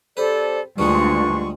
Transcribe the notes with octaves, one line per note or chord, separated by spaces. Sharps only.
C4 G4 A4 B4 C5 D5
D2 G2 G3 G#3 D4 D#4 F4 C#6